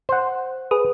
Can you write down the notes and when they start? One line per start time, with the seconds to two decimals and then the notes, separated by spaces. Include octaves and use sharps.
0.09 C5 F#5
0.71 G#4 B4 D#6